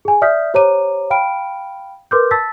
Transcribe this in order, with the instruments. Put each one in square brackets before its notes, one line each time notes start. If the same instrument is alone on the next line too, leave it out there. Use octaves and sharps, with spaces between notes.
[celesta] G#4 G#5
D5 E5 D#6 F6 G6 B6
G4 C5 C#5 A#5 D6 D#7
F5 G5 B5 F6 D7
A#4 B4 C6 D6 F6 G6
A5 E6 A6 B6